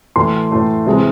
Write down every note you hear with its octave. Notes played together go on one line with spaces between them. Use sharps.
A2 E3 A3 C6
A2 E3 A3
C3 E3 G#3